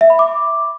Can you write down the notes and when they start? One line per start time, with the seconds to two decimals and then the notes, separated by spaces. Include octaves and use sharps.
0.01 E5
0.10 B5
0.19 D6